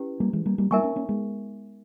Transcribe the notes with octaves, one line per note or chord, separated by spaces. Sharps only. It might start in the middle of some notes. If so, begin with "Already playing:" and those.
Already playing: C#4 E4 G4 B4
G3 A#3
E3 G#3
G3 A#3
G3 A#3
G3 A#3 D#4 A#4 E5 G#5 C#6
A#3 C#4
A#3 C#4
G#3 B3